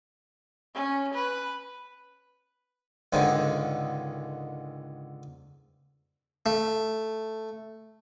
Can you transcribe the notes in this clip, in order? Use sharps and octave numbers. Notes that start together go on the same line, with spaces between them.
C#4
B4
C#2 G#2 D3 D#3
A3